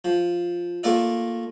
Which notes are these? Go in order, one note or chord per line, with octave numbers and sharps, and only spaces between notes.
F3
A3 A#3 F4 A#4 D5 E5